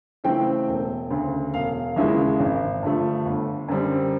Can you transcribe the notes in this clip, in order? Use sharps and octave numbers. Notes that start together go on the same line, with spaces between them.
C#3 E3 A3 C4 G5
E1
D2 C#3
E1 F5
D#2 C#3 E3 G#3 E5
G#1
G2 D3 F3 A3
G1
F#2 D3 G3 C4